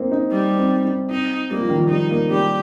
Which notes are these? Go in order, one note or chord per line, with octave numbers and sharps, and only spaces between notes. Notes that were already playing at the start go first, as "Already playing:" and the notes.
Already playing: A#3 C4 D#4
D#4
G3
C4
D#4
C4 D#4
G3 A#3
F3
D#3
F3
G3 D#4
A#3
G3 G4